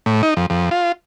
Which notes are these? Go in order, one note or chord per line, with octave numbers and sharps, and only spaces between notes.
A2
D#4
F2
F2
F4